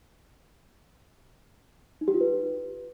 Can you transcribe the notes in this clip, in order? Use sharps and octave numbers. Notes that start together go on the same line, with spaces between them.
D#4
G4
F4
B4